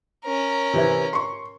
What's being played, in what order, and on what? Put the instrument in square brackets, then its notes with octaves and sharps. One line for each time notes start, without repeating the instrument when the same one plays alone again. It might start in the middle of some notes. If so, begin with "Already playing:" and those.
[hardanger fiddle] C#4 A#4
[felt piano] C3 E3 E4
C6 C#6